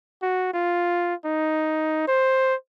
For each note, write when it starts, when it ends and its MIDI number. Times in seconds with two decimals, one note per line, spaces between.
0.22 0.51 66
0.53 1.14 65
1.25 2.03 63
2.08 2.55 72